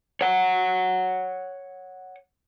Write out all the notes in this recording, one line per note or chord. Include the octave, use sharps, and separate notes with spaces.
C#5 F#5